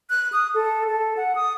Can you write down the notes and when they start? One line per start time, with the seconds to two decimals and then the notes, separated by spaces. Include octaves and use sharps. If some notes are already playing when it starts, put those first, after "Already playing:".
0.10 F#6
0.32 D#6
0.54 A4
0.88 A4
1.17 F#5
1.35 D#6